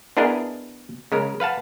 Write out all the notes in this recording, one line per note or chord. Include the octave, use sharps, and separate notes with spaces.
B3 D4 E4 G#4 A#4 D#5
C#3 G#3 A#4
B4 F5 F#5 A5